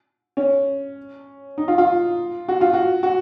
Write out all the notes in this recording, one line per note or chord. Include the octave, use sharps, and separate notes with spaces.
C#4
D#4
F4
F4
F#4
F4
F#4
F#4